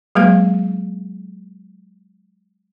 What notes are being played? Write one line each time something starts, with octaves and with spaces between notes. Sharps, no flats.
F#3 G#3 A#3 G#4 B4 F5